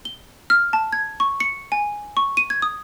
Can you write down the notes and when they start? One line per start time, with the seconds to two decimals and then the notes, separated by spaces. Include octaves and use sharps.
0.05 G7
0.50 F6
0.73 A5
0.93 G#6
1.20 C#6
1.40 C#7
1.72 G#5
2.17 C#6
2.37 D#7
2.50 G#6
2.62 D#6